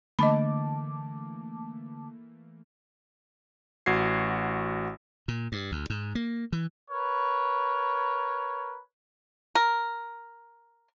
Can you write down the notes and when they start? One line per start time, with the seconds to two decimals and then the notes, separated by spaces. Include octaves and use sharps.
0.19 D3 E3 A3 A#3 D#5 A5 B5 D6
3.86 A1 F#4 G#6 C7
5.28 A#2
5.52 G2
5.72 D2
5.90 G#2
6.15 A#3
6.53 E3
6.90 A#4 B4 C#5
9.55 A#4